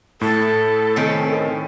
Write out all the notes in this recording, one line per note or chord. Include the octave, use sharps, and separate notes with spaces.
A2 A4
D#3 C4 C#4